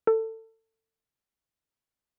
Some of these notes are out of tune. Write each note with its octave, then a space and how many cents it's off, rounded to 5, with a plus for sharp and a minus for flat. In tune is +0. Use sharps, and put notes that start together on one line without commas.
A4 +25